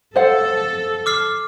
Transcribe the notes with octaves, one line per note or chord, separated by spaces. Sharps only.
A4 C5 F5 F#5
D6 F6 C7